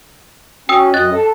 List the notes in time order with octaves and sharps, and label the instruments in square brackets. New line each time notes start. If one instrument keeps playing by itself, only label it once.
[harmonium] C#4 [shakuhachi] F#4 [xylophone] G5 D#6 E6
[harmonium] F#2 D#5 [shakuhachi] F#4 [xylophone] F#6 A6
[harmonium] A4 [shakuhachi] A5